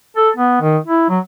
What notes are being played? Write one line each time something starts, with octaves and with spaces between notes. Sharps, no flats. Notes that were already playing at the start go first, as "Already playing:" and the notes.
A4
B3
D#3
E4
F#3